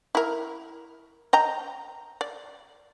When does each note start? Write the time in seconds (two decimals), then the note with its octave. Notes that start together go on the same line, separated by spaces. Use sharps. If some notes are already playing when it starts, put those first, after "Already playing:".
0.15 E4 A#4
1.33 D#5 G5 A#5
2.21 D5